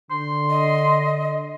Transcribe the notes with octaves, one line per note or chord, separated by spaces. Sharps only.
D3 C6
D#5